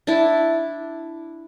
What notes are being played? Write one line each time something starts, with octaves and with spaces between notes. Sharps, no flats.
D4 E4